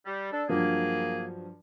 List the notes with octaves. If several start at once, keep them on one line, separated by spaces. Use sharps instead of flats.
G3
D4 A4
G2 F3 F#3 A#3 G#4